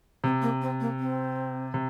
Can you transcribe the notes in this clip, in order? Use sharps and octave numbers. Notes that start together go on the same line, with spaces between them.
C3 C4
A#3
C4
A#3
C4
C3